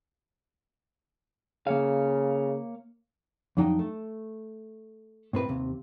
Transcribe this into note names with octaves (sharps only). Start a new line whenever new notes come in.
C#3 A#3 C#5 F5
F2 F#3 D4 D#4 G5
A3
A2 C4 B4
D#2 C3